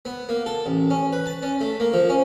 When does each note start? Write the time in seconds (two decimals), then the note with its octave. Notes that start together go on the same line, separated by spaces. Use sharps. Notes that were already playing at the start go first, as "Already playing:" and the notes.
0.05 B3
0.29 A#3
0.46 A4
0.66 A1
0.90 C#4
1.13 B4
1.26 A5
1.42 C#4
1.61 A3
1.80 A#3
1.93 F3
2.09 C#4